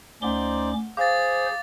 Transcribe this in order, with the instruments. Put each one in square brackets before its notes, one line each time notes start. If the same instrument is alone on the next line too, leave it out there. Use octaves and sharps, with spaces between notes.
[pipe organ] D2 C#4 D6 [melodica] D#4 C5 D5 [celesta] F#5 G7
[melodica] G#4 [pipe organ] C5 [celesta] F5 [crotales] D6 A6